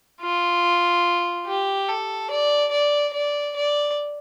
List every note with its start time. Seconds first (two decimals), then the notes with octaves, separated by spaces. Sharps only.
0.21 F4
1.47 G4
1.89 A4
2.31 D5
2.72 D5
3.13 D5
3.56 D5